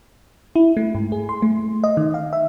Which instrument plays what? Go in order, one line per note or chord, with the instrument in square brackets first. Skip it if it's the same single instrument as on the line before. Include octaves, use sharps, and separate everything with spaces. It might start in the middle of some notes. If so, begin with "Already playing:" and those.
[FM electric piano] E4
A3
G#2
G#4
C6
A3
D#5
D#3
F5
E5